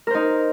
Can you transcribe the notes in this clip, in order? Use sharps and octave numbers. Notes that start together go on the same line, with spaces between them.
D#4 A#4 C5